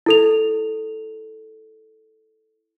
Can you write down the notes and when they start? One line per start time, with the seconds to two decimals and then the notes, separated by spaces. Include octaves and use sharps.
0.06 E4 A4 F7